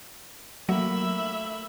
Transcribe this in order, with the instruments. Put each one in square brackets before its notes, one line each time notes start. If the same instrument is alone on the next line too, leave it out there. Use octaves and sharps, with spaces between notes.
[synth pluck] F#3 [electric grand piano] A3 A#3 [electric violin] E5 B5